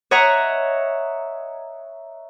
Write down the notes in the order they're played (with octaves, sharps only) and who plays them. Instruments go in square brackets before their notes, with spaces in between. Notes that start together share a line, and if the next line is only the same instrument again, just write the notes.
[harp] C#5 D#5 E5 F#5 A#5